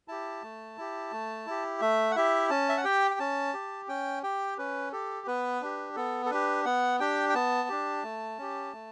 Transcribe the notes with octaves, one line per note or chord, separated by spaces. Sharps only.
E4 G4 A5
A3
E4 G4
A3
E4 G4
A3 E5
F#5
E4 G4 E5
C#4 A5
E5
F#5
G4 G5
G5
C#4 A5
G4
C#4 G5
G4 G5
C#4 B4
G4 A4
B3 B4
D4 G4
B3 A4
A4
D4 G4 B4
B3 F#5
D4 G4 G5
G5
B3 A5
D4 G4
A3
C#4 G4
A3